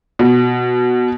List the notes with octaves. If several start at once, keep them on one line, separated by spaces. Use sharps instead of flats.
B2